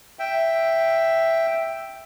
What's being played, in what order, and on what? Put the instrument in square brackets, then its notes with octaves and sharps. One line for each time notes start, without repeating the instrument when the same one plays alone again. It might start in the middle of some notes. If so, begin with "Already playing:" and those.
[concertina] E5 G5